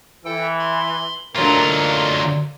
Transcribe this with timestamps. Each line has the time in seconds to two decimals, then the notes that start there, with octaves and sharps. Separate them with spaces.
0.25 E3 A4 G5
0.59 B5 C6
1.36 D2 D3 F#3 A#3 F4 A#4 D#5 C6